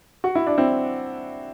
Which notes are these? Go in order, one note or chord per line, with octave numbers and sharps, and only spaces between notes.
F#4
E4
D4
C4 E4